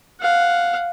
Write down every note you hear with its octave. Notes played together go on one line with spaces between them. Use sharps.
F5 F#5